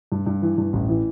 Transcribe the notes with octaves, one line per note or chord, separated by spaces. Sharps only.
G2
G2
E3
G2
A1
E3